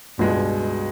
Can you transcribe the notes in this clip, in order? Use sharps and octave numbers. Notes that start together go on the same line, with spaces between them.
C#2 G2 B2 G#3